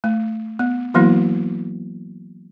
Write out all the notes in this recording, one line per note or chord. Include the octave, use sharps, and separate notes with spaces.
A3
B3
E3 F#3 A#3 B3 E4 F#4